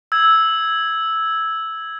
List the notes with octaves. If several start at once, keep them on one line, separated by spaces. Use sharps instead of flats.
E6 G#6